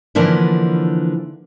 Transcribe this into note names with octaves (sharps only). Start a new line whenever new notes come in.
D3 E3 F3 A#3 D4 E4